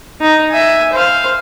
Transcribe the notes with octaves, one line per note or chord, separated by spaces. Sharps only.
D#4
E5 G#5
C5 F5